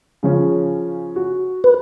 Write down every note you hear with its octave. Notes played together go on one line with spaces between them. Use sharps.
C#3 F3 C#4
F#4
B4